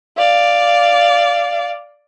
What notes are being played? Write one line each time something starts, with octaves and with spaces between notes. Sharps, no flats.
D5 F5